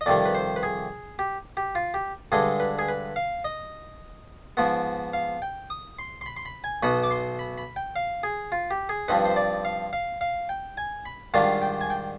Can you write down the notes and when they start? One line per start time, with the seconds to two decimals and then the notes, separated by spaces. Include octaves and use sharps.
0.01 D#5
0.06 F2 C3 D#3 G3 D5
0.26 B4
0.35 C5
0.56 B4
0.63 G#4
1.19 G4
1.57 G4
1.75 F4
1.94 G4
2.32 G2 D3 G#3 G#4
2.60 B4
2.79 G#4
2.88 B4
3.16 F5
3.44 D#5
4.57 G#2 F3 B3
5.13 F5
5.42 G5
5.70 D#6
5.99 C6
6.21 C6
6.26 B5
6.36 C6
6.45 B5
6.64 G#5
6.83 B1 B2 B3 D#4 B5
7.04 D6
7.11 C6
7.39 B5
7.58 B5
7.76 G5
7.96 F5
8.23 G#4
8.52 F4
8.71 G4
8.89 G#4
9.08 G2 F3 C4 D#4 B4
9.25 C5
9.36 D5
9.65 F5
9.93 F5
10.21 F5
10.49 G5
10.77 G#5
11.06 B5
11.34 G#2 D#3 G3 D4 F4 F5
11.62 G5
11.81 G#5
11.90 G5